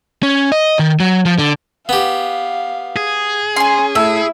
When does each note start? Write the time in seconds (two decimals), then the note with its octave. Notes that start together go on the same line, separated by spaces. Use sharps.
0.23 C#4
0.52 D#5
0.79 D#3
1.00 F#3
1.25 F3
1.39 D3
1.89 B3 G4 F5
2.96 G#4
3.56 C#4 G#5 C6
3.95 A2 E4 E5